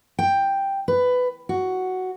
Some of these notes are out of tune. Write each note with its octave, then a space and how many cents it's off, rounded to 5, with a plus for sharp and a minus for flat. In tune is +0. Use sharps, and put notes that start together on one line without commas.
G5 +5
B4 +15
F#4 +5